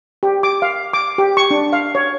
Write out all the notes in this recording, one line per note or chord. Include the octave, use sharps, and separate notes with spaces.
G4
D6
F5
D6
G4
C#6
D4
F5
C#5